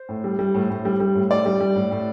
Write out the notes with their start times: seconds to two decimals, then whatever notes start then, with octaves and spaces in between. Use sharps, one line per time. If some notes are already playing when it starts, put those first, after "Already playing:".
Already playing: C5
0.09 A2
0.24 G3
0.39 G3
0.54 A2
0.70 A2
0.85 G3
1.00 G3
1.15 A2
1.31 A2 D5
1.46 G3
1.60 G3
1.76 A2
1.91 A2